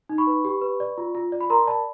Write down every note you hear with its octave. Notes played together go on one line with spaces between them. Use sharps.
D#4
B5 C#6
B4
G4
B4
D5
F4
F4
D5
B5
A#4 A#5 C6
D5 A5 B5